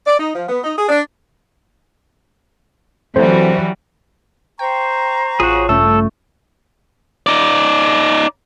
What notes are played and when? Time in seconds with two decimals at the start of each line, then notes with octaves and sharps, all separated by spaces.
0.06 D5
0.19 D#4
0.35 F3
0.49 B3
0.64 D#4
0.77 G#4
0.89 D4
3.16 D3 E3 F#3 G3 A3 C4 F#4 C5
4.59 C5 G5 A#5 C#6
5.40 A1 F4 F#4 G#4 C#5
5.69 G2 C#3 A3 C#4 A4
7.27 D#4 D5